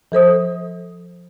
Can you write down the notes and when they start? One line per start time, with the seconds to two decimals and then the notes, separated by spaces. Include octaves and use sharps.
0.12 F3 A4 C5 D#6